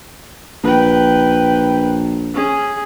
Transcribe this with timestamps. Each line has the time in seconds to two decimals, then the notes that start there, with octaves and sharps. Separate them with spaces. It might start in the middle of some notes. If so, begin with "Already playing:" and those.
0.64 A#1 B4 G5
2.34 C#4 G#4